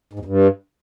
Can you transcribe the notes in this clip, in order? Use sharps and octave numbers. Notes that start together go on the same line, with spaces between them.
G#2
E2
G2